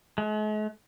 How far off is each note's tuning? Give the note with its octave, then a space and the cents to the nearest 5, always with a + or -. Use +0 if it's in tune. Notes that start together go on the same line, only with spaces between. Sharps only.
G#3 +45